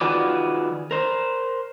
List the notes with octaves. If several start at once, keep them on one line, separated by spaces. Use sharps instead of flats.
D#3 F4 F#4 G#4 B4 D5
A#4 C5